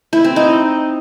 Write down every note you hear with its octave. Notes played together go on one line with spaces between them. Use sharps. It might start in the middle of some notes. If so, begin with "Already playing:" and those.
E4
C4
D#4